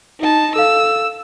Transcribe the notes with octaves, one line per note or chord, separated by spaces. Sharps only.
D#4 A5
A4 F5 E6